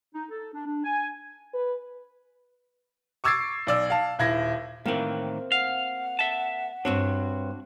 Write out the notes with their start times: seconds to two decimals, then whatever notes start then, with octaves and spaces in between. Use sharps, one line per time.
0.13 D#4
0.30 A4
0.53 D4
0.66 D4
0.84 G#5
1.54 B4
3.24 C#6 D6 E6 G#6 A6 C7
3.67 B1 D5 E6
3.90 F5 A5
4.19 D#1 E4 G#6 A#6
4.86 A2 D#3 E3 A#3 C4
5.52 F5 F#5
6.19 E5 A5
6.85 G2 C4 D4 F#4 C#5